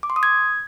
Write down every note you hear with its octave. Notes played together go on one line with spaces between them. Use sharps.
D6
C6
D#6
G#6